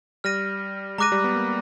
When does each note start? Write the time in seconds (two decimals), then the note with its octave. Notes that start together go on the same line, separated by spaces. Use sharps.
0.24 G3 F6 A#6 D#7
0.98 G#3 A#5 D6 F#6 A#6 D#7
1.12 G3
1.24 B3
1.36 A#3